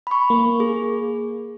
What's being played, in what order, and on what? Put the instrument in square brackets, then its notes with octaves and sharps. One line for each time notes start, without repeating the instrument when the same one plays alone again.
[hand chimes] B5 C#6
[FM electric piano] A#3
[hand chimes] G#4